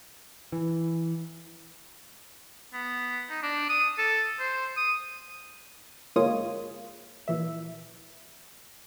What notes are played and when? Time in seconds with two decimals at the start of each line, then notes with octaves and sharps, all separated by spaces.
0.52 E3
2.73 B3
3.30 D#4
3.43 D4
3.69 D#6
3.98 A4
4.40 C5
4.77 D#6
6.16 G1 G#3 A#3 F4 C#5 D#6
7.28 A#2 E3 E5